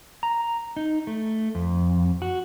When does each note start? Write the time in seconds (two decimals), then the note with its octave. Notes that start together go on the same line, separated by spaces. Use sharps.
0.23 A#5
0.77 D#4
1.07 A3
1.55 F2
2.22 F#4